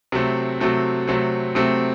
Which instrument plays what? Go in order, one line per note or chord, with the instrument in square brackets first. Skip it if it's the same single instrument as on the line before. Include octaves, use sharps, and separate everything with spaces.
[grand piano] C3 F#3 A3 C4
C3 F#3 A3 C4
C3 F#3 A3 C4
C3 F#3 A3 C4